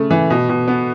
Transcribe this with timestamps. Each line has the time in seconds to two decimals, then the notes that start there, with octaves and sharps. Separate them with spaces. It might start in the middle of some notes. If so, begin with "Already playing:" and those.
Already playing: C#3 A3
0.11 E3
0.30 B2
0.49 B2
0.68 B3